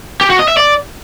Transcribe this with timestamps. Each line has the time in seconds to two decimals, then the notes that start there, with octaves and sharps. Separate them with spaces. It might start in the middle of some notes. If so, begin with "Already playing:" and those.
0.21 G4
0.30 F#4
0.39 D#5
0.48 E5
0.57 D5